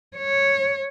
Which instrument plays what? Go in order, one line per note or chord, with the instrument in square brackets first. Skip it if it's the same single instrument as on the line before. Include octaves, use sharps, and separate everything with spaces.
[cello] C#5